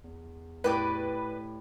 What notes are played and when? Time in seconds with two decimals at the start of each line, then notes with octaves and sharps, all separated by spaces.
0.04 E2
0.64 A2 G4 B4 D5